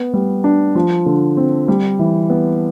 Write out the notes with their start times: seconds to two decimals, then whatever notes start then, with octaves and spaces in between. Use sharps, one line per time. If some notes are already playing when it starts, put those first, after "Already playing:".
Already playing: B3
0.14 G3
0.44 D4
0.75 F3
1.06 D3
1.37 C4
1.68 G3
1.99 E3
2.30 B3